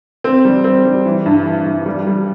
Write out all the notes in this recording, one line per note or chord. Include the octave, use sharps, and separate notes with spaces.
C4
G3
C4
G3
E3
G2
E3
G2
G3
G3